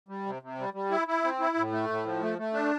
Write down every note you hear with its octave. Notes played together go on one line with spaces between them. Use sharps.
G3
C3
C3
G3
G3
E4
E4
C4
E4
A2
A3
A2
F3
A3
A3
D4